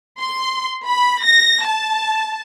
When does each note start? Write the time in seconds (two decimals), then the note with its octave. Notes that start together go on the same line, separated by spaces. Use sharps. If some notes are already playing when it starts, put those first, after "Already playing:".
0.19 C6
0.86 B5
1.23 A#6
1.64 A5